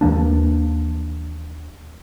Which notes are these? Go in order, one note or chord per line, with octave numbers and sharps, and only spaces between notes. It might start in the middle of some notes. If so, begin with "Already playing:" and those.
D#2 E3 A#3 D4